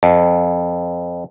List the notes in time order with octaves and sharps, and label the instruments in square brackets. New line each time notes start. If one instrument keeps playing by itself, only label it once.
[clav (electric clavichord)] F2